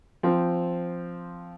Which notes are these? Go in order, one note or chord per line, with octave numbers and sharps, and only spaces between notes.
F3 C4